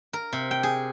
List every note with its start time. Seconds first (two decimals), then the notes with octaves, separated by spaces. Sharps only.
0.13 A#4
0.33 C3
0.51 G5
0.63 G#4